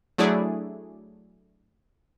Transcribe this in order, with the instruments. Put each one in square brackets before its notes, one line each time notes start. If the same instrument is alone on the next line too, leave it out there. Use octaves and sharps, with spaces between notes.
[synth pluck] F#3 A3 D4 E4 G#4 D5